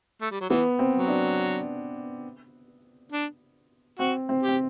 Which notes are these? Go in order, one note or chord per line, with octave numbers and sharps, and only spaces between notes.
A3
G3
F#3
E3 B3
C4
F#3
D4
D4
C4 F#4
C4
G4
C4